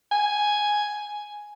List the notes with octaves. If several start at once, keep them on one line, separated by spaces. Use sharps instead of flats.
G#5